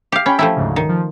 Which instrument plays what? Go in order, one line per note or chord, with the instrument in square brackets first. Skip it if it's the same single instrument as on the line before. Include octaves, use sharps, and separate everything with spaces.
[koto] G4 F5
[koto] C#4 [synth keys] G5 B5
[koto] F3 A3 E4
[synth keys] D2 G#2 C#3
[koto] D#3
[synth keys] F3